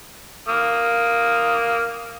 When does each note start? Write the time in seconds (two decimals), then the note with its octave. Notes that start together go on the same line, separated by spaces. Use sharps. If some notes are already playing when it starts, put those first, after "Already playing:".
0.48 A#3 D#6